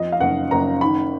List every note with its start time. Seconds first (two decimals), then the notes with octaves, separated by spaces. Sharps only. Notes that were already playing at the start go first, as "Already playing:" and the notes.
Already playing: F2 D#5
0.12 F5
0.20 F#1 F#5
0.51 F#1 A#5
0.81 D#3 B5